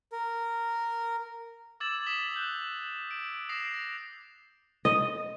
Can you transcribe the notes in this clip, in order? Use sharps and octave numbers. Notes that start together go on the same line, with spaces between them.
A#4
D6 E6 G#6 A6 E7 F#7
D#6 A6 B6 E7 F#7 G7
F#6 G6 F#7 G7
D7
D#6 A#6 C7 E7 F7
D7
D#5